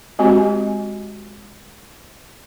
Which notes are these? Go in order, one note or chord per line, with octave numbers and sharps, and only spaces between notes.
G#3 C4 F#4 G4